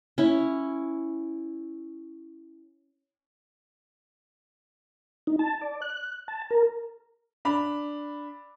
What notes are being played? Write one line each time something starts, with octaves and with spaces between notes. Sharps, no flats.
C#4 E4
D#4
A5
D5
F#6
A5
A#4
D4 B5 F7